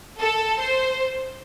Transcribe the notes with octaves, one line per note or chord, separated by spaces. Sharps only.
A4
C5